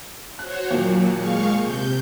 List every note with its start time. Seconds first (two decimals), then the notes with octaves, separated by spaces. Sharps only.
0.39 F#4 C5 C#5 F#6
0.70 D#2 A#2 F#3
1.13 G#3 F5 C#6
1.57 C3 G6